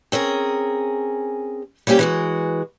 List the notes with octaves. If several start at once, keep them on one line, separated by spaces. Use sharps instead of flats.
C4 C#4 G#4 A#4
G3 A#3 C4 C#4 G4
E3 G#3 F#4